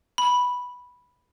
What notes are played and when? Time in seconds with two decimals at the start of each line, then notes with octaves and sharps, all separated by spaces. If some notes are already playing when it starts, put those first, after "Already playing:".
0.18 B5